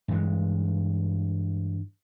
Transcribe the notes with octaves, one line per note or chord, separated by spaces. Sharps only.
G2 E3 G#3